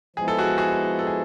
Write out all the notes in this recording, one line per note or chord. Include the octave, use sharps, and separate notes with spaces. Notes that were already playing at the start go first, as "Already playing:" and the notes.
F3 G#3 B3 E4 G#4
A4
F#4 G#4
F#4 G#4
A4
G#4